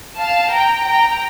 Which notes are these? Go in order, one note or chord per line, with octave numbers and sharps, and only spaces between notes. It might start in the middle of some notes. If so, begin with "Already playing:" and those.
F5 A5
G5 A#5
G5 A#5